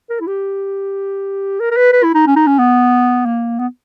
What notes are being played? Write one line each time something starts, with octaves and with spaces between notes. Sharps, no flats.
A#4
E4
G4
A#4
A#4
B4
B4
E4
D#4
C#4
D#4
C#4
B3
A#3
B3